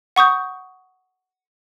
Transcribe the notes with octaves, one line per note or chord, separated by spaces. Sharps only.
F#5 C#6 D#6 G6